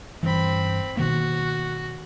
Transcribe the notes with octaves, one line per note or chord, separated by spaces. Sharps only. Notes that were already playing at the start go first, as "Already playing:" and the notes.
G2 E3 C4 B5
B2 D#3 A#3 F#4